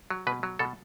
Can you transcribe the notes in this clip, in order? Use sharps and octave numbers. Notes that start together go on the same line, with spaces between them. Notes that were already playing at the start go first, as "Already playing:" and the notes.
F#3
B2 B4
F#3
B2 A4